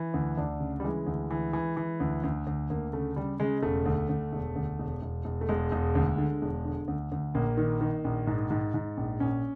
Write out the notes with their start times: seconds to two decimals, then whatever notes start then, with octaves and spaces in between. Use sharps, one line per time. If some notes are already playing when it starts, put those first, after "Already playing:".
Already playing: E3
0.14 D2
0.37 D2 D4
0.60 C#3
0.80 G3
0.84 E3 G#3
1.07 D2
1.30 E3
1.53 E3
1.77 E3
2.00 D2
2.24 D2
2.47 D2
2.70 D2 A#3
2.93 C#3 A3
3.16 C#3 G3
3.40 C#3 G#3
3.63 E1 A3
3.86 D2
4.09 D2
4.33 E1
4.56 D2
4.79 E1
5.02 E1
5.25 E1
5.41 A3
5.49 E1 G#3
5.72 E1
5.95 D2
6.18 D3
6.42 E1
6.65 D3
6.88 D2
7.12 D2
7.35 A#1 A#3
7.57 D#3
7.81 D#3
8.04 A#1
8.27 G#2
8.50 G#2
8.74 G#2
8.97 A#1
9.20 A#1 C#4